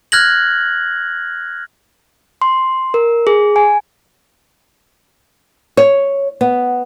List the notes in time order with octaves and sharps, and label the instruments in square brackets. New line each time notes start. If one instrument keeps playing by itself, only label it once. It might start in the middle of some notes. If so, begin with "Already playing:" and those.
[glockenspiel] F6 F#6 G#6 A#6 F#7
[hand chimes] C6
A#4
G#4
G#5
[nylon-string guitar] C#5
B3